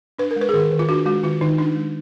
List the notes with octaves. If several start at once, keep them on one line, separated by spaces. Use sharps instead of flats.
D4 B4
A#4
G#3
B4
G#4
D#3 A#4
D#3
F4
D4 F#4
G#3 F#4
D#3 F4
D#3 D#4
D4 D#4
G#3